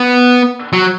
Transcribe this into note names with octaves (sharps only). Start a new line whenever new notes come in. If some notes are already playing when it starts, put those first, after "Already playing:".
Already playing: B3
F#3